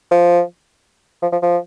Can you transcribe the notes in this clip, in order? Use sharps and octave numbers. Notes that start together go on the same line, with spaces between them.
F3
F3
F3
F3